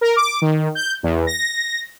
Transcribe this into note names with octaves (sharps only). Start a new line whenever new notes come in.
A#4
D6
D#3
G6
E2
A#6